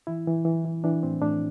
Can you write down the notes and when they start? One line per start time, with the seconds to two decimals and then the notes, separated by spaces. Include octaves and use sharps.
0.07 E3 E4
0.27 E3
0.45 E3
0.65 E3
0.84 E3 D4
1.03 A2 C4
1.21 A2 D4